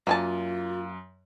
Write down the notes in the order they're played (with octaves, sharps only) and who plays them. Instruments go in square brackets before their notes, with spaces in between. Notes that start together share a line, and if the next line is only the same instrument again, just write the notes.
[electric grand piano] F#2 [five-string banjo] A#3 G#5 A5 [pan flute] F4